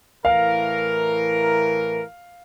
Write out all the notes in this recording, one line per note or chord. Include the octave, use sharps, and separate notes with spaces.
A2 E3 A#4 F5